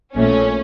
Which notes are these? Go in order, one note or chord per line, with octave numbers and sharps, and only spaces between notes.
A#1 A#2 A3 C#4